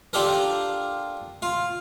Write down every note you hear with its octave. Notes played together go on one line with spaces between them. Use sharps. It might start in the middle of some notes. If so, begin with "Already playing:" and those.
D4 F4 G4 A4 A#4
F4